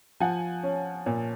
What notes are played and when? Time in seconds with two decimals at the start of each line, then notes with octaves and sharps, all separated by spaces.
0.20 F3 F#5 G#5
0.63 C#4
1.06 A#2